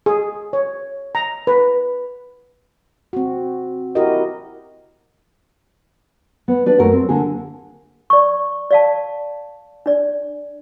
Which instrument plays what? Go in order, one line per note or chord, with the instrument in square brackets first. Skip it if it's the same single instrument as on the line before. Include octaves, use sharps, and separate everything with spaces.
[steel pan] G#4
C#5
A#5
B4
[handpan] C4 F#4
E4 F#4 G4 A#4 D#5
[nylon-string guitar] B3
D4 B4 D5
F#2 A3 A#4
C4
D3 A#3 G#4
[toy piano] D5 C#6
D5 F5 A5
D4 D5